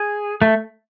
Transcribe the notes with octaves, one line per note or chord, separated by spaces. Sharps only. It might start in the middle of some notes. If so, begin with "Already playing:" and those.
Already playing: G#4
A3